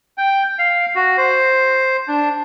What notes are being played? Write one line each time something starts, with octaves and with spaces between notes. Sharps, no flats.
G5
F5
F#4
C5
D4